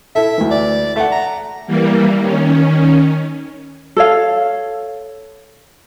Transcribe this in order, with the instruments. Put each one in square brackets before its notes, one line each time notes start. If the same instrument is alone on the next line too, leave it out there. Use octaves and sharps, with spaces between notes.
[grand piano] E4 A4 [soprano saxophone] E5
[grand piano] D2 E3
[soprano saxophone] D5
[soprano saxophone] A3 [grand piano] E5 F#5
[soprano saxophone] A#5
[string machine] E3 G3 A#3
D#3 C#4
[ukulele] A4 C#5 F5